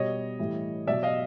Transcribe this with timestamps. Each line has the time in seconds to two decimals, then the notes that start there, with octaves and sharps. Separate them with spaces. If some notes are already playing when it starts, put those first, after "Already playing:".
Already playing: B2 G3 C#5 D#5
0.39 A2 E3 G3
0.87 B2 F#3 D5 E5
1.03 D#5 F5